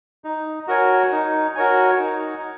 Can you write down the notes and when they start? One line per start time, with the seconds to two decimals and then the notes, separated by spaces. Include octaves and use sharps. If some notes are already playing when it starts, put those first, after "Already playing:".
0.24 D#4
0.68 F#4 A#4 C#5 G#5
1.12 D#4
1.55 F#4 A#4 C#5 G#5
1.99 D#4